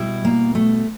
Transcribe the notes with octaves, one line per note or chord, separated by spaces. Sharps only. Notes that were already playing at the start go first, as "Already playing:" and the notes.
Already playing: B2 G3 E4
A#3
A3